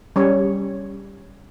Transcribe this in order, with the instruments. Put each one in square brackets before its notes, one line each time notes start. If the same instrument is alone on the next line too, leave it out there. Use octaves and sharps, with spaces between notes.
[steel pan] G3 C#4 C#5